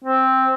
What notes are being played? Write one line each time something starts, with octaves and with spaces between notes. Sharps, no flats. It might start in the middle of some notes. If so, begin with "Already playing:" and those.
C4